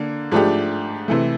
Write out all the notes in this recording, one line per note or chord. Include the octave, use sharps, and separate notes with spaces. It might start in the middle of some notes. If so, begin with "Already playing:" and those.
Already playing: D3 A#3
G#2 F3 A3 D4 G4
C3 E3 A3